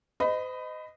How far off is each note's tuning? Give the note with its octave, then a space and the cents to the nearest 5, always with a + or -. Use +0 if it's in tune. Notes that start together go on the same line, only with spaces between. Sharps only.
C5 -40 D#5 -5 B5 +20